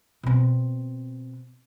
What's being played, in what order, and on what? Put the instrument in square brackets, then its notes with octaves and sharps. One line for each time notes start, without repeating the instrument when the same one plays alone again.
[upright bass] B2 C4